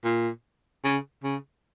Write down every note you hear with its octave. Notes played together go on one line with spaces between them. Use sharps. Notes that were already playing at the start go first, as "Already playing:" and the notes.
A#2
C#3
C#3